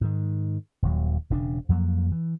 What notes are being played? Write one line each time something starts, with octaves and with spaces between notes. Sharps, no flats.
G#2 D#3
D#1 D#2 F#3
E1 C#3 D4
F2 F3 F#3 A#3
E3